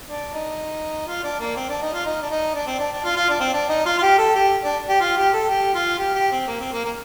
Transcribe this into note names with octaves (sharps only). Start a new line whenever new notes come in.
D4
D#4
F4
D4
A#3
C4
D4
D#4
F4
D#4
D4
D#4
D4
C4
D4
D4
F4
F4
D4
C4
D4
D#4
F4
F4
G4
A4
G4
D4
G4
F4
G4
A4
G4
F4
G4
G4
C4
A#3
C4
A#3
A#3